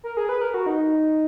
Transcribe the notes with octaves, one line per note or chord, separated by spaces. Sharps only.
A#4
G#4
B4
A#4
F#4
D#4